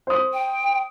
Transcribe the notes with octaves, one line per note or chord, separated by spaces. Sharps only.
C5 D#6
G5